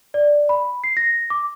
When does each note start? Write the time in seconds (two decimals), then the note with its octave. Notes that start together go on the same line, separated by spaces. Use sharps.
0.14 D5
0.49 B5
0.84 C7
0.97 A#6
1.30 D6